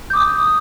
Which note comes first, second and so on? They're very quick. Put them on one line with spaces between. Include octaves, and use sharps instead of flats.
G6 D6 D#6